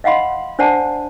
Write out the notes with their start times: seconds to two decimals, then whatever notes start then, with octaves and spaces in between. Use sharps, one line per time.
0.04 D#5 F5 F#5 B5 C6
0.59 D4 C5 D5 F#5 A5